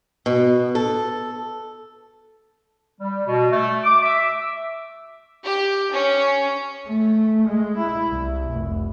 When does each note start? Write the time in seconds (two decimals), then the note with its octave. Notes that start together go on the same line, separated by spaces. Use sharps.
0.26 B2
0.75 A4
3.01 G3
3.27 B2
3.52 A3
3.84 D6
4.03 E5
5.43 G4
5.91 C#4
6.88 A3
7.48 G#3
7.77 E4
8.11 C2
8.52 F1